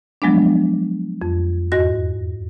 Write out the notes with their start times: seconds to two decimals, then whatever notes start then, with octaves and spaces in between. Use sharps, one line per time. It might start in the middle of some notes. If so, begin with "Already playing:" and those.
0.22 F3 F#3 G#3 B3 D4
1.22 F2
1.72 E2 G#2 F#4 D#5 A#6